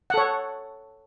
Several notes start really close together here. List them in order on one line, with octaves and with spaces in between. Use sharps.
F#5 A4 C#5